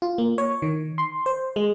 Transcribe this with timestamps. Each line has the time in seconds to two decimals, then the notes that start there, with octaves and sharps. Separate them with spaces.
0.02 F4
0.18 A#3
0.38 C#5
0.62 D#3
0.98 C6
1.26 C5
1.56 G#3